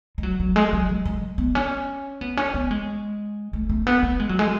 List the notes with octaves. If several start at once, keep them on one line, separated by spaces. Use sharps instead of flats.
G#3
F#3
F#3
G#3
F#3
F#3
G#3
B3
C#4
B3
C#4
B3
G#3
A3
A3
B3
B3
G#3
F#3
G#3